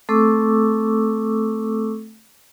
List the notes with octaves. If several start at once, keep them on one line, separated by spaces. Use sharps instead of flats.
A3 C4 A4 C#6 D6 E6